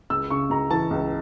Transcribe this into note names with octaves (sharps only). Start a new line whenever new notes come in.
C#2 E6
C#3 C#6
C#2 A#5
E3 A5
C#2